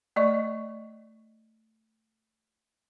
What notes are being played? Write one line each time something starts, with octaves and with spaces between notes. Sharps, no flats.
A3 D5 D#5 C#6